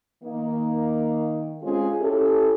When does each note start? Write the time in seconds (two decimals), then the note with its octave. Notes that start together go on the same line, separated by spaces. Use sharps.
0.23 D#3 A#3
1.62 G#3 C4 C#4 F4 G#4
2.00 C#4 E4 G4 A4